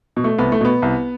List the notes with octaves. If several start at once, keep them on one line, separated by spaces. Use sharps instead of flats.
B2
A3
C2 B3
A3
B2 B3
C2